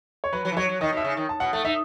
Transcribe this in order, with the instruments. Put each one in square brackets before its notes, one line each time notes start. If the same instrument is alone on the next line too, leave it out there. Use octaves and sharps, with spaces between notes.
[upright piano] C#5
[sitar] F#3 [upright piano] B4
[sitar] F#3
E3
[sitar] F#3 [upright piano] C#5
[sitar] F#3
[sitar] D#3 [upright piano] D#5
[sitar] B2
[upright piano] E5
[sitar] C#3
D#3
[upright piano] A5
[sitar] B2 [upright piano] F#5
[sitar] A3 [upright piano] F#5
[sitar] D#4 [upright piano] E5